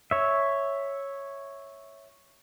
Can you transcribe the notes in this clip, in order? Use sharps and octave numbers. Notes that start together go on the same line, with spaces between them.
C#5 E5